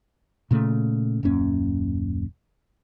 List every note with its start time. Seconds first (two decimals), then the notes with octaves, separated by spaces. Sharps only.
0.51 A#2 C#3 A3
1.23 D#1 F#2 A#3 C#4